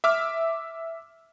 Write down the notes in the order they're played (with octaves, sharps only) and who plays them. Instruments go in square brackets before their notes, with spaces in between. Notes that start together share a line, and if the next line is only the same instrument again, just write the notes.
[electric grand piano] E5 D6 F6